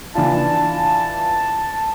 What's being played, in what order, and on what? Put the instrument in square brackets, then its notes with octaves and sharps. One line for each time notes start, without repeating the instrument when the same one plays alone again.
[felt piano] E3 D4 F4 [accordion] A5